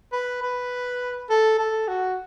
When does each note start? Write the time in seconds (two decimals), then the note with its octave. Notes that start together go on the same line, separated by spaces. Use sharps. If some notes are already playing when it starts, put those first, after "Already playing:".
0.12 B4
0.42 B4
1.30 A4
1.58 A4
1.88 F#4